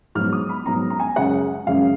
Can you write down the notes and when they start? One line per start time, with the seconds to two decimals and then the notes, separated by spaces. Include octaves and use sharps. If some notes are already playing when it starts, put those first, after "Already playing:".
0.15 G#2 F#3 B3 F6
0.33 D#6
0.49 B5
0.66 G#2 F#3 B3 A#5
0.90 A#5
1.00 G#5
1.16 F#2 C#3 G#3 C#4 F#5
1.67 F#2 C#3 G#3 C#4 F5